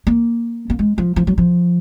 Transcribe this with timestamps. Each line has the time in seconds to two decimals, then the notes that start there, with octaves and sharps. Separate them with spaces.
0.07 A#3
0.70 A#3
0.79 G#3
0.98 F3
1.16 F3
1.27 F#3
1.38 F3